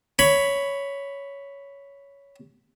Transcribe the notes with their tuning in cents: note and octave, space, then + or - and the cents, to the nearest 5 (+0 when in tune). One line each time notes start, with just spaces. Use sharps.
C#5 +10 B5 +5